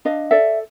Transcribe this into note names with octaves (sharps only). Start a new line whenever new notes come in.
D4 D#5 F5
A4 D5 E5